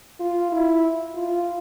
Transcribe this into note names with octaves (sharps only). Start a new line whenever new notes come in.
F4
E4
F4